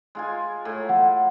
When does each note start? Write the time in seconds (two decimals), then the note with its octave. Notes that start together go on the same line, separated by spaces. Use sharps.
0.15 G#3 F4 G#5
0.65 A2
0.89 F#5